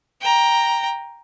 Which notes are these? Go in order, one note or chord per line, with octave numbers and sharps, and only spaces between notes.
G5 A#5